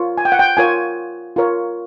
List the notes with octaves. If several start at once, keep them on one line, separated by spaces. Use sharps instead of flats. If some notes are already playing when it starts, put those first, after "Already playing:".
Already playing: F4 A#4 C#5
G#5
G5
F#5
G5
F4 A#4 C#5 G#5
F4 A#4 C#5